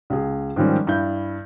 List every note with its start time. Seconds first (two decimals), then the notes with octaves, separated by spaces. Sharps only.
0.10 C#2 G#4
0.56 G#2 D#3 F3 G3 C#4
0.87 G2 E4 G6